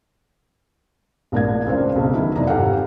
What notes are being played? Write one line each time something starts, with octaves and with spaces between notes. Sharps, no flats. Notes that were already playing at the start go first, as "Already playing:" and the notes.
A#1 A2 D4 A#4 F5 G#6
C#2 C4 D4 C5 F5
F#1 B1
D#3 E3 F#3 E4
F1 D#4 D5 A#5
G#1 F2 G4 A4 F5 F#5